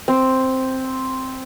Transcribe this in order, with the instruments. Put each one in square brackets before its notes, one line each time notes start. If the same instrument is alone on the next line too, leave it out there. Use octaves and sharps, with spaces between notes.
[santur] C4